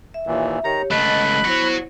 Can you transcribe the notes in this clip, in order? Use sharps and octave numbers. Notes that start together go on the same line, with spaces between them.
E5
D#2 A#2 E3
D#3 G4 C#5 A#5
C#2 A3 D#5 A5 B5 F#6
B3 E4 F#4 C5 C#5